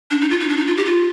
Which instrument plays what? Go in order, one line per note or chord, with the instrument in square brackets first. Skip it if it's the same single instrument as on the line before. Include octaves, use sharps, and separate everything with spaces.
[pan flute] D4
D#4
F4
D#4
D4
D#4
F4
G4
F4